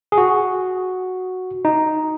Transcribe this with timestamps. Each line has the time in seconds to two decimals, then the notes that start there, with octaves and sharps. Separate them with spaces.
0.12 G#4
0.18 F#4
1.65 D#4